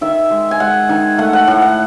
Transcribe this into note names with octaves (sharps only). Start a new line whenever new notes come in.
D#3 E5
G#3
G#5
G#3 F#5
D#3 G#5
A3 F#5
F#5
A2 F#5
F#5